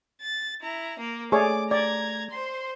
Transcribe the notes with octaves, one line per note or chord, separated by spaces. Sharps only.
A6
E4 A#5
A#3 A#4
A3 G#4 C#5 D5 D6
D5 A#5 G#6
C5 C6